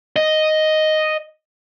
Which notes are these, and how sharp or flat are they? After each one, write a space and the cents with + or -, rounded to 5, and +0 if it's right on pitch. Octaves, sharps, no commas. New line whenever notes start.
D#5 +0